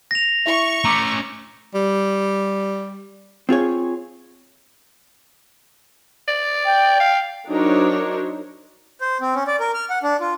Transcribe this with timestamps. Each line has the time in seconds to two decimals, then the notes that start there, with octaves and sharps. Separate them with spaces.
0.11 A#6 F7
0.46 E4 E5 C#6
0.85 A3 C#4 A#5 D6 C#7
1.75 G3
3.49 C4 F4 G#4 C#5
6.28 D5
6.65 G5
7.00 F5
7.47 F#3 D4 D#4 A#4 C5 C#5
9.01 C5
9.21 C4
9.35 C#4
9.47 D5
9.60 A#4
9.74 F6
9.90 F#5
10.03 D4
10.21 F4